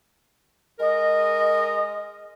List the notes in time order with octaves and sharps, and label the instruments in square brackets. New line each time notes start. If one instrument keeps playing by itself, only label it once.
[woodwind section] G#3 A#4 D#5